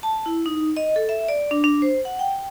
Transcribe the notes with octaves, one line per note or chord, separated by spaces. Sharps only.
A5
E4
D#4
D#5
A4
E5
D5
D4
D4
C5
F#5
G5